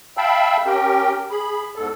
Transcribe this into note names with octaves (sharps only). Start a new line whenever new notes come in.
E5 F5 G5 A5 B5 E6
C#4 G4 A#4 G5
G#4 B5
E2 G#2 A4